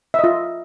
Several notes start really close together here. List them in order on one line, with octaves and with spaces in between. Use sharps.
E5 D#5 F4